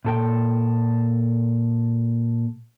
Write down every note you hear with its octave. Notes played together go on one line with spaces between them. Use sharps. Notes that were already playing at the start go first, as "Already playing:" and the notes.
A#2 A4 G5